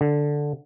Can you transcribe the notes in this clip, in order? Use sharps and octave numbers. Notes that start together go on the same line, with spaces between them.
D3